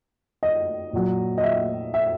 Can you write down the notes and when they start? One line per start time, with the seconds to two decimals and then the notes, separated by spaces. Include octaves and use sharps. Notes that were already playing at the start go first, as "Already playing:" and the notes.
0.43 D#5
0.93 A#2 F#3
1.38 D#5
1.44 E5
1.94 E5